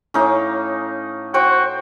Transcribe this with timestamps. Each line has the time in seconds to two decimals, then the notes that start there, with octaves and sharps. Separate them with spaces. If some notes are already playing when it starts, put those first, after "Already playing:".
0.14 A2 C#4 D#4 F5 C#6 D6
1.34 F#4 C5 G5